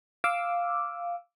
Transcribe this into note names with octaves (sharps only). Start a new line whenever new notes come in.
F5 D6 E6